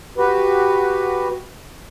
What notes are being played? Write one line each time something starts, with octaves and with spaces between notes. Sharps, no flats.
F#4 G4 B4